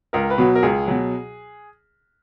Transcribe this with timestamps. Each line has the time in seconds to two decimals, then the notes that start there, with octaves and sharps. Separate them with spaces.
0.13 C#2 A#4
0.30 B4
0.38 B2 F#3
0.55 A#4
0.63 C#2 G#4
0.88 B2 F#3